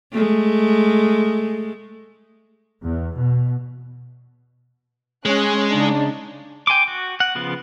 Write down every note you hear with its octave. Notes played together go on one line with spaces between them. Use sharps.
G#3 A3
E2
B2
G#3 C#4 F#6
C#3 D4 D#4
G5 G#5 C6 D6
F#4
F#5
C#3 F3 B3 F4